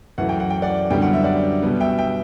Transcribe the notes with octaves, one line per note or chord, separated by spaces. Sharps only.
F#2 E3 A3 F#5
G5
F#5
G5
D5 F#5
F#2 D3 G3 B3 G5
F#5
E5
D5 F#5
B2 G3 B3
E5 G5
E5 G5